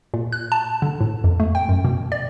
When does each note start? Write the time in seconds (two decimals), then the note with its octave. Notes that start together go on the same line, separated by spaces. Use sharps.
0.14 A#2
0.32 F#6
0.52 A5
0.82 D3
1.01 A2
1.24 F2
1.40 A3
1.55 G5
1.69 F#2
1.85 B2
2.12 D5